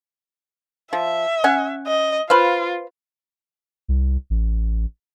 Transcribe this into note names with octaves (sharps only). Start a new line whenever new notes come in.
F3 E5
C#4 F#5 G#5
D#5
F4 B4 C5 F5
C2
A1